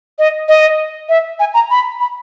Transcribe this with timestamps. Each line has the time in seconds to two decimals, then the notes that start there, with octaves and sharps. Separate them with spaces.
0.19 D#5
0.48 D#5
1.09 E5
1.40 G#5
1.54 A#5
1.70 B5
2.00 B5